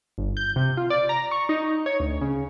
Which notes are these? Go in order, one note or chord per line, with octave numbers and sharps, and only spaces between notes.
G1
G6
C3
F4
D5
A#5
C#6
D#4
C#5
D2
C#3